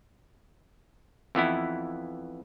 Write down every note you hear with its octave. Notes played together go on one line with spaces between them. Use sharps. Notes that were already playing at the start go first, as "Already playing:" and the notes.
F2 E3 B3 E4